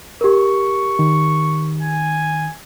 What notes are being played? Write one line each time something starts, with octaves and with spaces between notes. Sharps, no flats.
G4 A#4 C#6
D#3
G#5